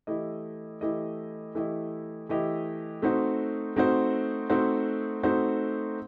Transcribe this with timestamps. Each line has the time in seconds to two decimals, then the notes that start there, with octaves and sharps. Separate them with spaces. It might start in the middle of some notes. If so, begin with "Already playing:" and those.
0.07 E3 A3 E4 G4 D#5
0.81 E3 A3 E4 G4 D#5
1.55 E3 A3 E4 G4 D#5
2.29 E3 A3 E4 G4 D#5
3.02 A3 C4 D#4 F#4 C5
3.76 A3 C4 D#4 F#4 C5
4.50 A3 C4 D#4 F#4 C5
5.23 A3 C4 D#4 F#4 C5